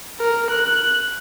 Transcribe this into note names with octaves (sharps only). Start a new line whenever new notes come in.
A#4
F#6